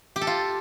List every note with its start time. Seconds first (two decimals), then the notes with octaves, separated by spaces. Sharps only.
0.16 G4
0.21 A4
0.27 F4